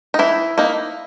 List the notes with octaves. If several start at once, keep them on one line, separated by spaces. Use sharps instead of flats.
D#4
E3 E4
A#3 D#4